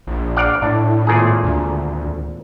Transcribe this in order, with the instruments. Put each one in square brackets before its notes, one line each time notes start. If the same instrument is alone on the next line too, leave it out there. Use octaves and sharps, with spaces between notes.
[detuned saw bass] A#1
[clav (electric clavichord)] D5 F5 F#5
[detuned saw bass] A2 [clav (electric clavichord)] D4
[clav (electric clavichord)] G#1 A#2 G#4
[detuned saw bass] D2